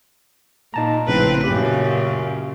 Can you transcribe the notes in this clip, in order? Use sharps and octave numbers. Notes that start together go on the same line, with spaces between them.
A#2 D#4 A5 A#5
A#1 A2 C#3 C4 B4
F#2 A#2 C#3 G4